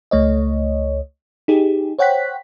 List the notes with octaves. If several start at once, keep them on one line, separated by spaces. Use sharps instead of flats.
C#2 A3 C#5 D#5
D#4 G4 G#4
C5 C#5 F#5 G5 F#6 B6